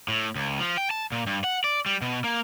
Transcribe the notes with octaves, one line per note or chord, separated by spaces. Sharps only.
A2
C#2
F3
G5
A5
A#2
G2
F#5
D5
G3
B2
A#3